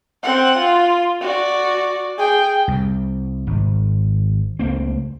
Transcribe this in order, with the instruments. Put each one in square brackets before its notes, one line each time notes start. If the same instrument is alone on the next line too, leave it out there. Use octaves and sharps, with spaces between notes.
[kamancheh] C4 F#5
F4
F#4 D5
G#4 G5
[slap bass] C2
G#1
C#2 A3 A#3 C4